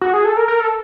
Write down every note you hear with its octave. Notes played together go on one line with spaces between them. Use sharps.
F#4
G#4
A4
A#4
A#4
A4